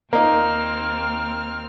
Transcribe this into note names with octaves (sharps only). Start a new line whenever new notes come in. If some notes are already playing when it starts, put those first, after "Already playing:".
D#2 A#3 C4 D#4 F6